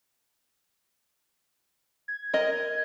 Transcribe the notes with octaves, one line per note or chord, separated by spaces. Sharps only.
G#6
A#4 D#5